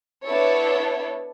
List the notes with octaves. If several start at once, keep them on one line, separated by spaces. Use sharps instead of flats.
B3 D4 E4 A4 C#5